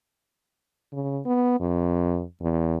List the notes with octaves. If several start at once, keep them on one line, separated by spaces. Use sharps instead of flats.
C#3
B3
F2
E2